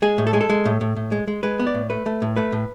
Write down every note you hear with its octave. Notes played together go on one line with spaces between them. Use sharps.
G#3 G#4
A2
A4
G#3 G#4
A4
G#3
A2
A2
A2
G#3
G#3
G#3 B4
B3
D5
A2
A3 B4
A3
A2
A3 B4
A2